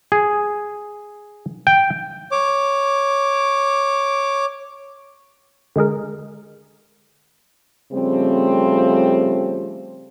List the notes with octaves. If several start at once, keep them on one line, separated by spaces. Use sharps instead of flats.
G#4
G5
C#5 D6
D3 G#3 G#4 A#4
C#3 F3 G3 A3 C4